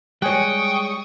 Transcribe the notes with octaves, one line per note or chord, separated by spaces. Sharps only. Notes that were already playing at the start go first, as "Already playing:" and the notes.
G3 G#3 C#5 G5 G#5 C#6 D#6 F#6